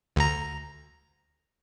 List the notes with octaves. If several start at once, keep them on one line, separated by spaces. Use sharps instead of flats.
D2 A#5